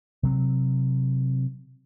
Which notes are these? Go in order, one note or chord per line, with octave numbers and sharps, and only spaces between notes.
C3 F#3 C4